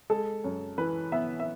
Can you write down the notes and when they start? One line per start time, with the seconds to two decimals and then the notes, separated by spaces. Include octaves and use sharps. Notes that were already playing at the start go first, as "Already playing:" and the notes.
0.10 G#3 A4
0.44 F#2
0.78 E3 B4
1.12 B3 E5
1.40 E5